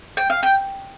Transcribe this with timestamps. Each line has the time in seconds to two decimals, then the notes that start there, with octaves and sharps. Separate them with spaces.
0.17 G5
0.30 F5
0.43 G5